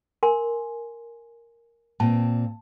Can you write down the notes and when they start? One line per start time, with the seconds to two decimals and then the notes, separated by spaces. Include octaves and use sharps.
0.23 A#4 G#5 C6
2.00 A#2 C4 A5